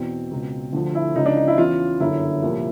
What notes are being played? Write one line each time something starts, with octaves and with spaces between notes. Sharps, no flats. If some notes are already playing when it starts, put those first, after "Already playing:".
Already playing: E2 B2 C4
C#2 B2
D2 D3 F3
E4
C#2 C#3 F3 D#4
D4
D#4
E4
E2 C#3 E3 F4
G1 F#2 D3 E4
C2 A#2 F3